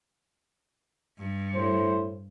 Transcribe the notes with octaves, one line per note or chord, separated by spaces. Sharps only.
G2
A2 C5